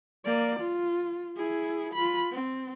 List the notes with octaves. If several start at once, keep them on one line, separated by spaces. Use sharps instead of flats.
A#3 D5
F4
E4 G#4
F4 B5
C4